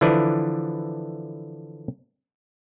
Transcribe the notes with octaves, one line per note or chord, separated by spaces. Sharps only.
D3 E3 F3 D4 E4 B4